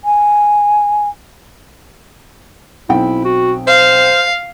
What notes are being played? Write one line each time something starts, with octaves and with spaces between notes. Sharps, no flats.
G#5
B1 C4 E4 G5
F#4
C5 F5